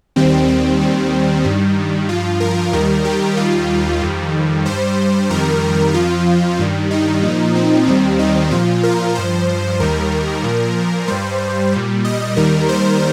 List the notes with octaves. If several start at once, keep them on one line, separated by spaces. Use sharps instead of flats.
D#2 D#3 G3 C4
C4
D#2 D#3 G3
G2 D#3 G3
G2 F3 F4
A#4
D#2 D#3 G3 A#4
G4
D#2 D#3 G3 F4
F2 D#3 G3
G2 G3 C5
F2 D#3 G3 A#4
F2 F3 F4
G2 D#3 G3
D#4
A#2 F3
C4
D#2 D#3 G3 C4
D#4
A#2 F3 F4
A#4
G2 F3 C5
D#2 D#3 G3 A#4
A#2 F3
G2 G3 C5
A#2 G3
D#5
D#2 D#3 G3 A#4
C5